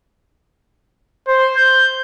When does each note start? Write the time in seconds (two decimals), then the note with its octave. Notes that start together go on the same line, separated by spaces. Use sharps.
1.28 C5
1.57 G6